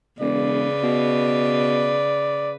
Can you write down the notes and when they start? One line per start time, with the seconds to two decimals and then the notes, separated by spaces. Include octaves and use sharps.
0.20 E1 C#3 B4 D5
0.83 B2